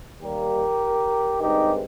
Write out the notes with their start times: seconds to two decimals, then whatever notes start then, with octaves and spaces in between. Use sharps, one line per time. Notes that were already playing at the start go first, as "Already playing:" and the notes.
0.22 D#2 D#3 G3 A#3 G4 A#4
1.40 G2 D#3 G#3 C4 D#4 G4